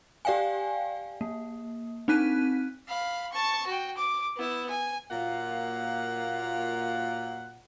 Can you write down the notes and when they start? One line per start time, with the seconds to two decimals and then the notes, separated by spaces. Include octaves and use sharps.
0.25 G4 D5 F5 G5 G#5
1.21 A#3
2.08 C4 D4 D#4 F#6 B6 D#7
2.88 F5 B5
3.32 A5 C#6
3.67 F#4 G5
3.97 D6
4.37 B3 E4
4.70 G#5
5.11 A#2 F#3 A#3 F4 F#5